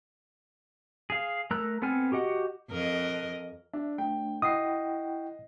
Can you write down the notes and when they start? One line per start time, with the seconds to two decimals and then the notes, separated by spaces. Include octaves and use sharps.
1.10 G#4 F5
1.51 A3 A#4 A#5 E6 F#6
1.82 B3 C4 A4 G#5 F6
2.12 F#4 G4 D#5 F#5
2.70 F2 A#4 D#5
3.74 D4 E5
3.98 A3 D4 G5
4.42 E4 D#5 F#5 G5 D#6 C7